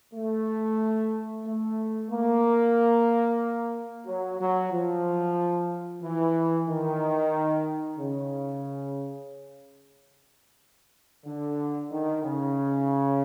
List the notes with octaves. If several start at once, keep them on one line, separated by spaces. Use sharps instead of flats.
A3
A3
A#3
F#3
F#3
F3
E3
D#3
C#3
D3
D#3
C#3